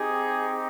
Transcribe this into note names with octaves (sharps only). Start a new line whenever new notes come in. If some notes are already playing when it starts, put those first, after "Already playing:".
Already playing: C4 D#4 G4 G#4